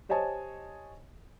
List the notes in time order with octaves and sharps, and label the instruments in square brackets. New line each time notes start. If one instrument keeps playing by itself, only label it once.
[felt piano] G4 C5 C#5 D#5 G#5 A5